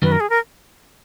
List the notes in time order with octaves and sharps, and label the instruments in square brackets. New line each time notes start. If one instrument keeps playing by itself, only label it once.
[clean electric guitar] F#2 D#3 F#3 [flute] B4
[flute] A#4
G#4
A#4